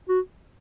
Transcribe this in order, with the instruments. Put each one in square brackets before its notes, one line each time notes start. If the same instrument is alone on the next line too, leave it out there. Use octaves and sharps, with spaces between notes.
[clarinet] F#4